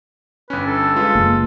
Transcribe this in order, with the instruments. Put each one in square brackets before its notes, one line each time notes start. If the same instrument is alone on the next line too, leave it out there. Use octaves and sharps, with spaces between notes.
[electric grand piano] G1 C#4 [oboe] B4
[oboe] A4
[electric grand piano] G#3 F4 B4
[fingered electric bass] F#1 A#3